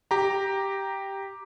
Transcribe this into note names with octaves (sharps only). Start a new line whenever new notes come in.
G4 A#5